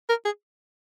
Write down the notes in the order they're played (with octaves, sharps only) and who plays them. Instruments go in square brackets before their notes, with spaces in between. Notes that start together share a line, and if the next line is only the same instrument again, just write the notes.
[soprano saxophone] A#4
G#4